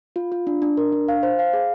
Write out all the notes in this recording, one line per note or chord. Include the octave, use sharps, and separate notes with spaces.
F4
F4
D4
D4
A#4
D4
F5
C5
F5
G#4